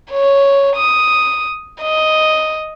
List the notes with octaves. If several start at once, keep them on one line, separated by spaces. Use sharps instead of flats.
C#5
D#6
D#5